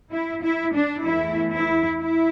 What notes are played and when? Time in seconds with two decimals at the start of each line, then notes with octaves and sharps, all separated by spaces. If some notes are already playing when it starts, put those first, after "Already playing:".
0.12 E4
0.44 E4
0.75 D4
1.05 E2 E3 A3 E4
1.52 E4
1.99 E4